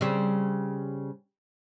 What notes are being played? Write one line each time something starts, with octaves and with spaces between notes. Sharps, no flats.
C#3 G3 C4